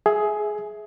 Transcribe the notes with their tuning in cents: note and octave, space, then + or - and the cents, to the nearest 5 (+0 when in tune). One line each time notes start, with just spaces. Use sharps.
G#4 +15 E5 -10